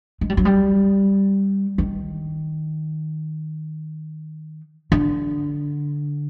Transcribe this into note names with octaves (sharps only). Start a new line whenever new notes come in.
G#3
G3
F#3
G3
D#3
D3